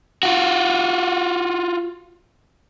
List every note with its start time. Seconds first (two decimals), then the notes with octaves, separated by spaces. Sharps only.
0.23 F4 F#4